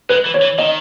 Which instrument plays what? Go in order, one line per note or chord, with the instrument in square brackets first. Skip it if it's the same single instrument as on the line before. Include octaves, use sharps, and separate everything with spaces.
[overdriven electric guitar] G#3 [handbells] B4
[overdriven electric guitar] E3
[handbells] C#5
[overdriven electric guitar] E3
[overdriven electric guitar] D#3 [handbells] D#5